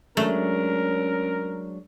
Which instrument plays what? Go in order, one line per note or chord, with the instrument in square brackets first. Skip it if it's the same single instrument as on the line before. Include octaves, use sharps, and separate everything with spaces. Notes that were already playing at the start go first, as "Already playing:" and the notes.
[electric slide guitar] F#3 G#3 D4 [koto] A3 [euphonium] C#4 [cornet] A#4